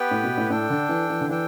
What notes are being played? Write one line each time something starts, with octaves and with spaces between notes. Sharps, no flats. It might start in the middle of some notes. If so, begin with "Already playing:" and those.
Already playing: B3 G4 B4 G5
A2
B2
A2
A2 D4 A4 G5
D3
E3
E3
D3
E3 D4 A4 G5